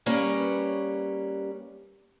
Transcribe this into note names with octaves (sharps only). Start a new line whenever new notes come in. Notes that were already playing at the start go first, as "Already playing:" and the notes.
G3 A#3 C#4 B4 C#5